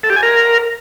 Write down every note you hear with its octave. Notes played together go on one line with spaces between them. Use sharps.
A4
G4
G#5
A#4